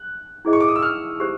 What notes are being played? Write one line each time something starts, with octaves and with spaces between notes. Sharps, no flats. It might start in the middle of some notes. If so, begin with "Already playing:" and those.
Already playing: F#6
E4 G#4 C5 D#5
C#6
D6
D#6
E6
F6
G4 C5